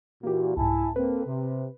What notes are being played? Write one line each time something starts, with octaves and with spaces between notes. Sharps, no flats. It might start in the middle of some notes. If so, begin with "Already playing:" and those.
A#2 E3 A#3 F#4 G4
C2 G#2 E4 G#5 A5
A#3 C4 A4 B4
C3